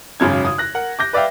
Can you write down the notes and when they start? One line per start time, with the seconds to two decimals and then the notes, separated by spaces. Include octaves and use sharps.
0.20 G#1 F#2 C#3 G#6
0.45 D#6
0.58 F#6 A#6
0.75 A#4 F#5
0.99 D6 G6 A#6
1.13 B4 D5 E5 F5 G5